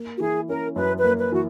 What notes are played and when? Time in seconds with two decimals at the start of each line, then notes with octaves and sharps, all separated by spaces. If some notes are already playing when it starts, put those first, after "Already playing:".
Already playing: A#3
0.17 F#4
0.20 E3 G#4
0.48 C#4 A#4
0.76 F#2 B4
0.97 B4
1.04 A#3
1.18 B4
1.32 E3 F#4